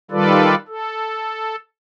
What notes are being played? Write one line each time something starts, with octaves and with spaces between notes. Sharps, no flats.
D#3 G3 F4 A4 B4 D5
A4